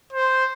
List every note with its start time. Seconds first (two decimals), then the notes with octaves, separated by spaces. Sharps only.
0.13 C5